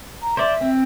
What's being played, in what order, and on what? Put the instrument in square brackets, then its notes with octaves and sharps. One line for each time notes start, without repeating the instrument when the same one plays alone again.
[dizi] A#5
[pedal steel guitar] C5 D5 [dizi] E5
[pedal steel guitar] C4